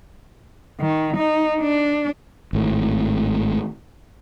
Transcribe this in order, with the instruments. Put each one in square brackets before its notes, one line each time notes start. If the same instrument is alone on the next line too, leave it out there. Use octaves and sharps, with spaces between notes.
[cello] D#3
D#4
D4
[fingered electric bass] G#1 A2